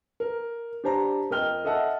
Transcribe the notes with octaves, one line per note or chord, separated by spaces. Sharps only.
A#4
D4 G4 C5 A5 A#5
F2 A#4 D#5 G5 F6 G7
A4 D#5 E5 F#5 A5